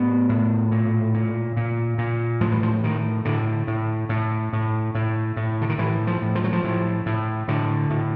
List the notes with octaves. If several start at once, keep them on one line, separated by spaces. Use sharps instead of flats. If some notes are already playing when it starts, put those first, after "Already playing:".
Already playing: A2 B3
A2
A#2
A#2
A#2
A#2
A2 F3
E3
F3
A2 D#3
A2 D3
A2
A2
A2
A2
A2
D3
D#3
A2 E3
F3
A2
F3
F#3
F3
A2
A2
A2 D3
A2